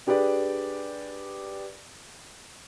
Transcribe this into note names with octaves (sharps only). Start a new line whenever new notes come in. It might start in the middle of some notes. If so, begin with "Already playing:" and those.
D4 G4 G#4 B4 D5